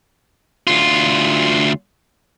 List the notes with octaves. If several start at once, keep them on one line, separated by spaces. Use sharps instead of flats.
D2 F4